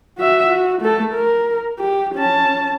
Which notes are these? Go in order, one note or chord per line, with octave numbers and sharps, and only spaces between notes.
F#4 E5
F#4
A3 A4
A#4
G4
C#4 A5